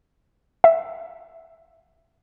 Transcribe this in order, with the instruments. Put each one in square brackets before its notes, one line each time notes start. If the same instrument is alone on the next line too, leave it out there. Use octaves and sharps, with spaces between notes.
[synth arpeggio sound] E5